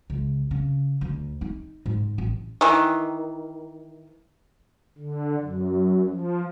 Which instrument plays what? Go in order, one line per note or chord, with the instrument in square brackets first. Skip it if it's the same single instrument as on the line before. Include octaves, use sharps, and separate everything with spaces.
[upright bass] C#2
C#3
D2
D#4
G#2
A1
[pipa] D#3 E3
[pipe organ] D3
F#2
F3